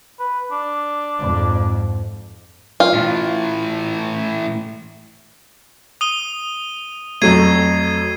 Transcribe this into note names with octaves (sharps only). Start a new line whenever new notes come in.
B4
D4
F2 G#2
F4
A2 E3
D#6 D#7 G7
F2 F#3 A3 G#6 C7 D#7